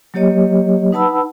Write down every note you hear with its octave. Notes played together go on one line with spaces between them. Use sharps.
F#3 A#3 G4 C#5 D#5
D#4 B4 F#5 A5 B5 E6